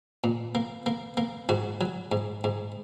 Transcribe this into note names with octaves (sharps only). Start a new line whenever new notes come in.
A#2
A#3
A#3
A#3
G#2 F#4
F#3
G#2
G#2